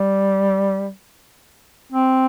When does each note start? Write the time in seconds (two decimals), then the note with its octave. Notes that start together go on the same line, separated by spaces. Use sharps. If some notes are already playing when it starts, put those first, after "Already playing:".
Already playing: G3
1.93 C4